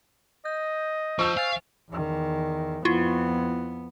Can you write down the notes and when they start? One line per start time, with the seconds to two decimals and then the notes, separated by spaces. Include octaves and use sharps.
0.45 D#5 G6
1.19 F3 C5 C#6 E6 G6
1.37 F5 G#5 A6
1.90 E2 D#3
2.85 F2 B3 E4 F4